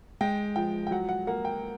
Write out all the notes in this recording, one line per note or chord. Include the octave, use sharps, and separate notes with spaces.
G#3 G5
F3 G5
G5
F#3 F#5
F#5
A#3 F#5
G5